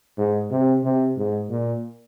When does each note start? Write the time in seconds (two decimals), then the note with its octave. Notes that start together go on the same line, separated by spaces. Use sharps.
0.18 G#2
0.51 C3
0.84 C3
1.17 G#2
1.49 A#2